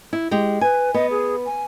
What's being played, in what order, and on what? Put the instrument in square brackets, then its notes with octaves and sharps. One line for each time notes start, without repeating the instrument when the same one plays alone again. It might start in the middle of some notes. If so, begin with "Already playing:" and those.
[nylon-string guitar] E4
G#3 G4
[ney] B4 [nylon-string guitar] G#5
[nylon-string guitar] B3 [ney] D#5
[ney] G#4
G#5